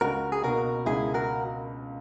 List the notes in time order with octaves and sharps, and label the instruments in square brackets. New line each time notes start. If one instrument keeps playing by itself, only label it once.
[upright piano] C#2 [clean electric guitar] F#4 A#4
[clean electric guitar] G#4
[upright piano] B2 A#3 [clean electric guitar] F#4 A#4
[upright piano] C#2 [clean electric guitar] E4 G#4
[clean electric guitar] F#4 A#4